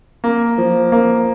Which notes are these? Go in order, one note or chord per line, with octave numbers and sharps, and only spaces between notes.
A#3
F3
A#3